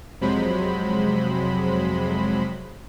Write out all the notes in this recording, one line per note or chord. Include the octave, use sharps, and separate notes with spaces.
F2 C3 F#3 G#3 C5 B5